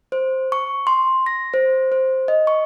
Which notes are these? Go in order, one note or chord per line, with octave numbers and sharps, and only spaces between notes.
C5
C#6
C6
A#6
C5
C5
D#5
C#6